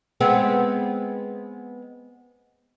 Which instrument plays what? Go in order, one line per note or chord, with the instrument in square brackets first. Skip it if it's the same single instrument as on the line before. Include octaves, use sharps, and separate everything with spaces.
[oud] G#3 B3 C4